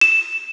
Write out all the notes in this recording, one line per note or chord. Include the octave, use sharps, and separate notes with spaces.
E7